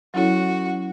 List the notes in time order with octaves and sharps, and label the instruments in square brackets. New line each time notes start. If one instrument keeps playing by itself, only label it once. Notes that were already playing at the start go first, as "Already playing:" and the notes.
[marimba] F#3 C#4 E4 A4 C#5 [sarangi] F#4